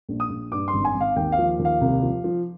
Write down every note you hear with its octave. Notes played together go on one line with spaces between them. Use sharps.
A#1
D#6
A#1
G2 D6
C6
G#1
G#5
G#1
F5
D#2 G5
F5
F3
D#2
F5
C2
F3
F3